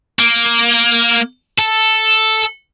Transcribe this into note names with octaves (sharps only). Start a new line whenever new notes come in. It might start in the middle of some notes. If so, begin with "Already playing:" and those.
A#3
A4